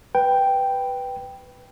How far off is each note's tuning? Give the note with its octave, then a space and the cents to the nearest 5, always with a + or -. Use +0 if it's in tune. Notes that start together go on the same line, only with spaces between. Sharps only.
B4 +0 G5 +0